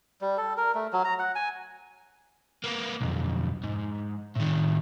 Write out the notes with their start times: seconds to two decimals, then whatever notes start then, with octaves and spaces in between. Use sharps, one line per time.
0.21 G3
0.38 A4
0.57 A#4
0.75 A3
0.93 F#3
1.05 A#5
1.19 F#5
1.35 G#5
2.64 A#3 B3
3.01 B1 F2
3.63 G#2
4.36 A2 D#3